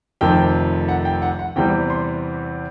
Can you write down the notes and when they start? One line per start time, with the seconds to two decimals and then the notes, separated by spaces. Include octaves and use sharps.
0.21 F1 F2 C3 D#3 G5
0.89 F#5
1.05 G5
1.22 F#5
1.39 F#5
1.56 E2 C3 E3 G3 G5
1.90 C6